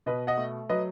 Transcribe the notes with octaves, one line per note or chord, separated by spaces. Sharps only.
B2 B4 D#5
D#5 F#5
A3
F#3 B4 D#5